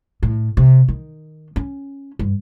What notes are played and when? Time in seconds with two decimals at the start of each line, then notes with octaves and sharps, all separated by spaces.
0.23 A2
0.57 C3
0.88 D#3
1.56 C#4
2.19 G2